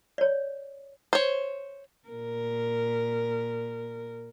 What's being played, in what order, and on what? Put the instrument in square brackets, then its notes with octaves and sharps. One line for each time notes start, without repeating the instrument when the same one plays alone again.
[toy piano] C#5 D5
[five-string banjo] C5 C#5
[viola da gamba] A#2 A#4